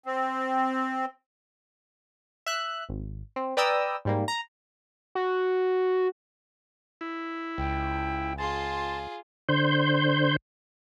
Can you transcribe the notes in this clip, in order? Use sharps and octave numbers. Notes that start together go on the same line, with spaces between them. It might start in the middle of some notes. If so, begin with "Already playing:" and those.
C4
E5 F#6
G#1
C4
B4 D5 G5 A#5 D#6 E6
G#2 G3 A#3
A#5
F#4
E4
C#2 G5
F4 G#4 A5 C6
D3 C5 G6